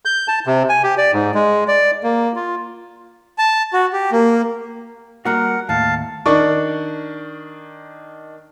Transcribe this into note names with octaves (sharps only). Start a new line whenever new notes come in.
G6
A5
C3
G#5
G4
D5
G#2
G#3
D5
A#3
F4
A5
F#4
G4
A#3
G3 A#3 F#4 A#4 F#5
D#2 A2 F5 A5
D#3 D4 D5 C#6